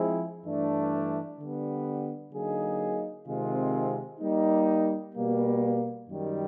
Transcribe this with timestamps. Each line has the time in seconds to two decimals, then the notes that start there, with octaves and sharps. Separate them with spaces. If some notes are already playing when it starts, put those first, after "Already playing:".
Already playing: F3 G#3 C4 E4 G#4
0.45 G2 E3 A3 D4
1.39 D3 G3 B3
2.33 D3 F#3 A#3 D#4 G#4
3.27 C3 D#3 G#3 C4 F4
4.20 G3 A#3 D#4
5.15 B2 G3 A#3
6.08 F#2 D#3 G3